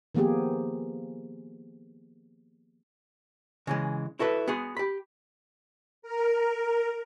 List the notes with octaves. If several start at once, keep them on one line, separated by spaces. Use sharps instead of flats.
D#3 F3 A#3 B3 G4 G#4
C#3 E3 G#3
E4 F#4 A4 B4
B3 F#4 G#4
G4 B5
A#4